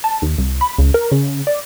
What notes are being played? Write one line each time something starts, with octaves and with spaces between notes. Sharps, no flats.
A5
D#2
C2
B5
C#2
A#4
C#3
D5